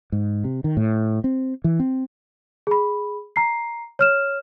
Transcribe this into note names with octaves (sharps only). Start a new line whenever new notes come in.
G#2
C3
D#3
A2
C4
E3
C4
G#4 B5
A#5 C7
C#5 F6 E7